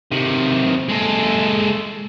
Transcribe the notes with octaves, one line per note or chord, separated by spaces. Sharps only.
C3 D#3
G#3 A4